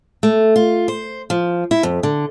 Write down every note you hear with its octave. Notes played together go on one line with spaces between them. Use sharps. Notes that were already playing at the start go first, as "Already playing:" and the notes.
A3
F4
C5
F3
E4
F2
D3